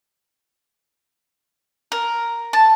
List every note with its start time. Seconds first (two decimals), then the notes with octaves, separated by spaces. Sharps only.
1.92 A#4
2.53 A5